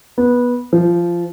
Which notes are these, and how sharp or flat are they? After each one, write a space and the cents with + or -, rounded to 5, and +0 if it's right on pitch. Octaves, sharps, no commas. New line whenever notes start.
B3 -15
F3 -15